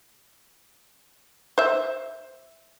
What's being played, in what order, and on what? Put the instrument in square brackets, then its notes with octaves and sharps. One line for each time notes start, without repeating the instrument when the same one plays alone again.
[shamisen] C5 E5